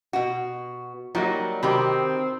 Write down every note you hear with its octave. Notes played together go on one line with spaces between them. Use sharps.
B2 F#4
F#3 G3 A#3 D#4 F#4 D#5
C3 D#3 C4 G4 B5 C6